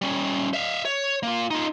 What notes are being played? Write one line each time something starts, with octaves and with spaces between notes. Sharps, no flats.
G3 C#4
E5 F5
C#5
A#3 F4
D#4 F4